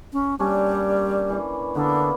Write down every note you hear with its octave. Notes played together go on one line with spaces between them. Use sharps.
C#4
G3 A#3 C#4 D4
E3
D3 A#3 B3